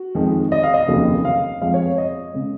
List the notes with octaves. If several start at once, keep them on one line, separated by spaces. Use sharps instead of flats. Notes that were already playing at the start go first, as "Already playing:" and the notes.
Already playing: F#4
F2 D#3 G#3
D#5
F5
D#5
F1 D#2 C#3 F#3
F5
F2 F3 G#3 F5
C#5
D#5
C#3 G#3